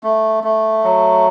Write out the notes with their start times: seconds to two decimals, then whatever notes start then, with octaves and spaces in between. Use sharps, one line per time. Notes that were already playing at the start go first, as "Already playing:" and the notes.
0.03 A3
0.44 A3
0.84 F#3